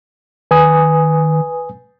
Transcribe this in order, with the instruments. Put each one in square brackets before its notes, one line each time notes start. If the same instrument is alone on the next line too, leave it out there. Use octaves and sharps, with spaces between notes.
[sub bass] D#3 [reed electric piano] B4 G#5 D#6